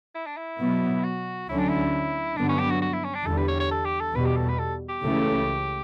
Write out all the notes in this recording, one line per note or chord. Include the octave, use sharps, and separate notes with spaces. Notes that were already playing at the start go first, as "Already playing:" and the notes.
E4
D4
E4
B2 F#3 B3
F#4
D2 D3 F#3 C#4 E4
D4
E4
G2 D3 F#3 B3 D4
C#4
G4
F#4
F#4
E4
C#4
D4
E2 D3 G3 A4
B4
C#5
C#5
A4
G4
A4
E2 B2 G3 B4
G4
A4
B4
A4
G4
C#2 C#3 E3 A3